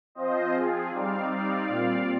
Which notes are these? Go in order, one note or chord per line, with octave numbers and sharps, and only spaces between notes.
F3 C4 F4 C5 D#5
G#4
G3 C4 D#4 D5 F5
D5 F5
A#2 G3 C4 F4